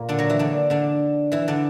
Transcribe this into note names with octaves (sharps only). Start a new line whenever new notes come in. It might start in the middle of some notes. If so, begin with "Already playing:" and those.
Already playing: A#2 A#3
D3 D4
F#3 F#4
E3 E4
D3 D4
D3 D4
E3 E4
D3 D4